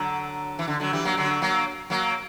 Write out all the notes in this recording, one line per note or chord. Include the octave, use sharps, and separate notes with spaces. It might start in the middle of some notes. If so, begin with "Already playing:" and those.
Already playing: D3 F#3
E3
D3
D3 F#3
E3 G3
F#3 A#3
D3 F#3
F#3 A#3
F#3 A#3